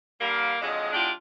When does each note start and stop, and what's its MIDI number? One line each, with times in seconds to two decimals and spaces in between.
0.21 0.56 50
0.21 0.56 55
0.21 0.56 58
0.62 0.91 41
0.62 0.91 50
0.62 0.91 54
0.62 0.91 56
0.93 1.11 40
0.93 1.11 56
0.93 1.11 62
0.93 1.11 65
0.93 1.11 67